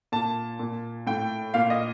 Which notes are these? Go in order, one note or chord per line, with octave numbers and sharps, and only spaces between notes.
A#2 A5
A#2
A2 G5
A#2 F5
D#5